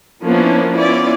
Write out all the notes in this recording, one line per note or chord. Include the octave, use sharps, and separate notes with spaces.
F3 A#3 B3 C#4 D4 E4
B3 C#4 E4 F4 D5